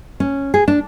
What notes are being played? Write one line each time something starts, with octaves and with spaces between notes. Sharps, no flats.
C#4
G#4
D4